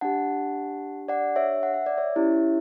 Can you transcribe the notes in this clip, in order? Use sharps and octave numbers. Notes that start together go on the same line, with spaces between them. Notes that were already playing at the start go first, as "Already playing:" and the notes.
D4 G4 F#5 A5
D5 F#5
C#5 E5
F#5
E5
D5
C#5 E5
C#4 E4 G4